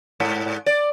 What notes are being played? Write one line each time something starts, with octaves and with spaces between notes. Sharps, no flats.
G#2
D5